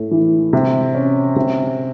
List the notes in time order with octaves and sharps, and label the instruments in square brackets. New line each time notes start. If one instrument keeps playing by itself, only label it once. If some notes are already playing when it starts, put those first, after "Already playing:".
Already playing: [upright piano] A2
E3
C3
C#4
C3